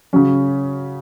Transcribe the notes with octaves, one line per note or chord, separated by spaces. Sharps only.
C#3 F#3 C#4